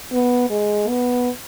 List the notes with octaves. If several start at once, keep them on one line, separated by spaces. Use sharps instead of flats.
B3
G#3
B3